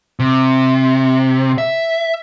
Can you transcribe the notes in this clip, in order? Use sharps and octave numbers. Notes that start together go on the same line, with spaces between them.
C3
E5